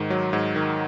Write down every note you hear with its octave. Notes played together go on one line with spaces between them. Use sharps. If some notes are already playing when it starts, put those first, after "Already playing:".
Already playing: G#2 D#3
F#3
G#2
D#3